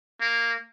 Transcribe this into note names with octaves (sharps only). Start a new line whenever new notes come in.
A#3